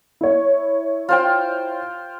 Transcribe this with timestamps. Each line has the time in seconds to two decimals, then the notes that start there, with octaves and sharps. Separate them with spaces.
0.21 E4 C#5
1.09 F4 C5 G5